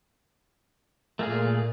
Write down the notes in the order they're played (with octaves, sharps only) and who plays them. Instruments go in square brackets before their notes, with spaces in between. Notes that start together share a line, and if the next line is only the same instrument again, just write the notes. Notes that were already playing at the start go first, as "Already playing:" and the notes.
[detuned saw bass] A#2 [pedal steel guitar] A3 A#3 G#4